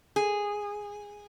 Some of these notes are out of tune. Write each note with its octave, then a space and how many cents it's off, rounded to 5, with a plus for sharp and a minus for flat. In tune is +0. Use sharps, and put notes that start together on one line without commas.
G#4 -10